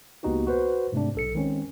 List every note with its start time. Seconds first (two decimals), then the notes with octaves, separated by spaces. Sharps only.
0.23 C#2 A#3 B3 D#4 F#4 G4
0.47 F#4 B4 C5
0.92 G#2 C3 A3 C4 D4
1.15 B1 A4 C#7
1.35 D#3 G#3 C4 C#4